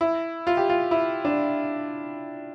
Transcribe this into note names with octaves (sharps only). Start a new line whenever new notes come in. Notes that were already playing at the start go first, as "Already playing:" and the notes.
E4
F4
G4
F4
E4
D4